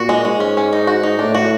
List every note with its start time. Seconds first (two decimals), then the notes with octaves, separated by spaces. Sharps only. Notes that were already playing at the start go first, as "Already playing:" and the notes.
Already playing: A#2 F#4
0.09 G#3
0.25 G#2 G#3
0.40 C#4
0.57 C#4
0.73 D#4
0.87 F#4
1.03 D#4
1.19 A2 D4
1.35 F#4